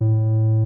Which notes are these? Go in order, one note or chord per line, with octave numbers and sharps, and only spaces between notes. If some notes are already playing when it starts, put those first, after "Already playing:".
A2